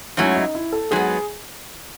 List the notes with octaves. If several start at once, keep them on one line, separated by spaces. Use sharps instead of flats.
G#2 F#3 A3 C#4 E4
D#4
E4
A4
G#2 F#3 B3 G#4